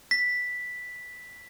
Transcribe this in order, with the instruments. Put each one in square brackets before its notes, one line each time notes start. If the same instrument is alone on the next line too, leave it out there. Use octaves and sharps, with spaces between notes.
[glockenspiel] B6